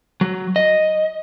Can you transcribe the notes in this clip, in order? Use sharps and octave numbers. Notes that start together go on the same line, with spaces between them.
F#3
D#5